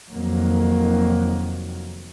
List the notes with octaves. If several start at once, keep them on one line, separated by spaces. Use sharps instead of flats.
F1 F2 D#3 F#3 A#3